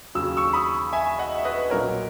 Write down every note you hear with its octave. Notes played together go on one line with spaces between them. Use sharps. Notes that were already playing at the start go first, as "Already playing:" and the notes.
D#2 C#3 F#3 E6
C#6 E6
B5 D#6
E5 G#5
D#5 F#5
E5
B4 D#5
B1 A#2 F#3 A#4 C#5